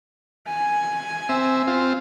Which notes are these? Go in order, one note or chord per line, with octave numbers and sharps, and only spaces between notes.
G#5
C4 E5
C4 F4